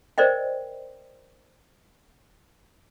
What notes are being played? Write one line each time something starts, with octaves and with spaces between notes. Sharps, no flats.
A#4 C5 D5 D#5 G5